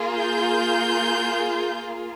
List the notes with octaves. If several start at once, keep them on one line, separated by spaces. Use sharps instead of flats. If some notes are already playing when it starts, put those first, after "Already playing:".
Already playing: A#3 F4 G#4
G6